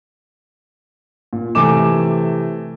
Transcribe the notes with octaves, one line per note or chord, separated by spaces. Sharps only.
A#2
C3 E3 A3 G#5 D6 E7